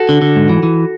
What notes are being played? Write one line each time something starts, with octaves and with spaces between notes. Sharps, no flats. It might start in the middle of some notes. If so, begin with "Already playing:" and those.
Already playing: F#4 A4
D3
D3
G#2
E3
E3